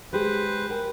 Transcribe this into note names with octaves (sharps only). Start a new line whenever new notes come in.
G#3 G4 G#4 B4 C5
A#4 G5 G#5